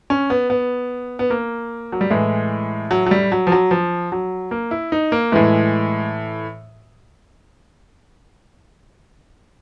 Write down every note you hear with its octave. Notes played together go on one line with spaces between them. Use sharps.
C#4
B3
B3
B3
A#3
F#3
G3
A2 E3 G#3
F#3
F#3
G3
F#3
F3
F#3
F3
F#3
A#3
E4
D#4
A#3
A2 E3 G#3